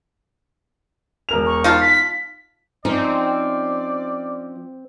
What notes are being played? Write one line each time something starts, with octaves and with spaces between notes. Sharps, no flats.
E1 A#4 F7
C#6
D#4 F4 A5
B6
F3 C4 C#4 D#4 D5